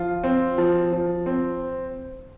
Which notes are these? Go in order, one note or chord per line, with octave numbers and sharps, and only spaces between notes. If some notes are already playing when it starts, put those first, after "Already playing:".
Already playing: F3 F4
C4
F3
F3
C4